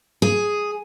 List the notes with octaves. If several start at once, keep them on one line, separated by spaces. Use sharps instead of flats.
G#4